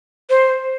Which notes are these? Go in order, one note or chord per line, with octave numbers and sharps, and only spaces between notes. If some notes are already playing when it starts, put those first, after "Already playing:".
C5